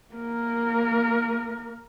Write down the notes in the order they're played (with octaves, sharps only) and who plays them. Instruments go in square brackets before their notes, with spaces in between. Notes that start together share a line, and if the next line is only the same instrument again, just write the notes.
[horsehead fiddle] A#3 A#4